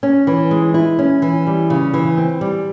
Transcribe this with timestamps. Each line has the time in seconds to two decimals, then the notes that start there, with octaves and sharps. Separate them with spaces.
0.03 C#4
0.27 E3
0.51 G#3
0.74 E4
0.99 C#4
1.22 E3
1.47 G3
1.70 C#3
1.94 E3
2.17 C4
2.41 G3